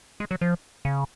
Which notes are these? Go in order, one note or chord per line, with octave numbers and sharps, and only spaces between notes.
G#3
F#3
F3
C#3